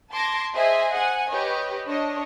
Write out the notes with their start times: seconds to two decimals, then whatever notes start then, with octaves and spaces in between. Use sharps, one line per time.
0.10 A5 C6 D6 G#6 A#6
0.53 G#4 C5 D#5 E5 G#5
0.95 F#5 G#5
1.28 G4 B4 C#5 D#5
1.87 D4 C#5 D#5